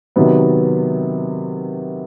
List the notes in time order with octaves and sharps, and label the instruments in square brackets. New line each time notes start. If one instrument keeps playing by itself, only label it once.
[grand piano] C3 D#3 F#3 B3